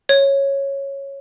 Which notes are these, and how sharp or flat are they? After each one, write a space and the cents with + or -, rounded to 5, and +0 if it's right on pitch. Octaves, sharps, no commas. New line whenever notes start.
C#5 -10